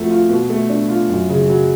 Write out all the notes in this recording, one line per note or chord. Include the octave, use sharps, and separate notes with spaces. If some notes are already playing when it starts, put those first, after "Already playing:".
Already playing: F2 F3 A3 F#4
F4
B2
A3
D4
F4
F#2
C#3
F#3